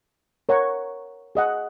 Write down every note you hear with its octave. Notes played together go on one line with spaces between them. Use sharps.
A#4 C#5 F#5 A#5 C#6
G#4 D#5 F#5